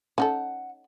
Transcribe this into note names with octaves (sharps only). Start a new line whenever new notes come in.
C#4 D#4 A4 F#5